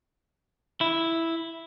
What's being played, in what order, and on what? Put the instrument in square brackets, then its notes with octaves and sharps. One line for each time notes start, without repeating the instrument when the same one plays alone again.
[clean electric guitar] E4